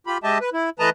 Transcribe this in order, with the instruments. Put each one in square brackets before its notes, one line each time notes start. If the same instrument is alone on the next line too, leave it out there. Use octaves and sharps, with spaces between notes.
[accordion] F4 G4 B5
G#3 G4 D#5 E5 A5
B4
E4
E3 A3 B4 D#5 A5 A#5